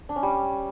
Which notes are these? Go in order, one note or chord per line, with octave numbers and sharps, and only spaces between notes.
D4
C#4
G3